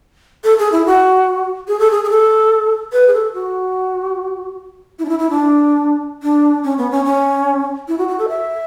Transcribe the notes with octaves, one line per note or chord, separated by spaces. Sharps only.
A4
G#4
E4
F#4
G#4
A4
G#4
G#4
A4
B4
G#4
A4
F#4
E4
D4
E4
E4
D4
D4
C#4
B3
C#4
C#4
E4
F#4
F#4
A4
E5